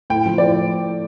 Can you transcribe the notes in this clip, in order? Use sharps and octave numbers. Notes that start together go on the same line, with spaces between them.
A2 G5
F3
A2 D5